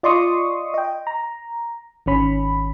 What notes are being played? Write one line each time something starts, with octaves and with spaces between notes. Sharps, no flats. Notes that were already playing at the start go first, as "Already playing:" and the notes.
F4 D5 D#5 C6 C#6 D#6
D#5 G5
A#5
G#1 D#3 C#4 B5